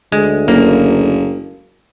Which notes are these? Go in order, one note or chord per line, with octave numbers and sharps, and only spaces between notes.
D2 G#3
F#1 A#3